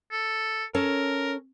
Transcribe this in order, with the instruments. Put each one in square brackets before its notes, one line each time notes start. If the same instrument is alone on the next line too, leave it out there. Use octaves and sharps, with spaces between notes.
[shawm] A4
[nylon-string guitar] C#4 A4 C#5 [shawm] A#4